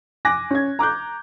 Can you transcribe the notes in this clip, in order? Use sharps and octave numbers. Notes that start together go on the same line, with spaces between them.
G#5 D6 F#6 A#6
C#4 G#6
A#5 D6 F#6 G6